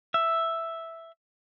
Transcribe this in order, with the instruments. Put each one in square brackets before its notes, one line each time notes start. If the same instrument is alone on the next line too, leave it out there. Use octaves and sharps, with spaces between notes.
[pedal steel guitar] E5